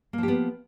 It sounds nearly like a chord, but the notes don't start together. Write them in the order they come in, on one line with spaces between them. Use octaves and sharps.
A#3 F3 G4 B3